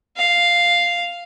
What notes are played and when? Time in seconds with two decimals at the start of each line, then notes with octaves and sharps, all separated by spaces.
0.17 F5